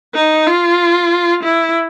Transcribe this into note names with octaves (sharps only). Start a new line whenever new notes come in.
D#4
F4
E4